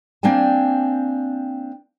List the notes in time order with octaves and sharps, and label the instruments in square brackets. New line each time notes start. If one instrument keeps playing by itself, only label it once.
[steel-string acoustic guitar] A#3 C4 D4 G5 G#5